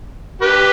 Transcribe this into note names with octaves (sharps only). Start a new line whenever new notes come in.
G4 B4